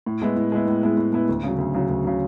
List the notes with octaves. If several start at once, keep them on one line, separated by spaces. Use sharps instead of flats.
A2
G#3 B3 E4
A2
G#3 B3 E4
A2
G#3 B3 E4
A2
G#3 B3 E4
D2
C#3 F#3
D2
C#3 F#3
D2
C#3 F#3